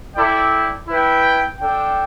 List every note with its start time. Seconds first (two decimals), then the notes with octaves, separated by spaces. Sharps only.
0.15 E4 A4 D5 G5
0.87 E4 B4 G5
1.60 D4 A4 G5